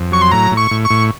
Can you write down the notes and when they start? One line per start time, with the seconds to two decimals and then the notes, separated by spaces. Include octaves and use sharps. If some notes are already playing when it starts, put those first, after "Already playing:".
Already playing: F2
0.12 F#3 C#6
0.22 C6
0.31 A2 A#5
0.51 A2
0.57 C#6
0.71 A2
0.85 C#6
0.90 A2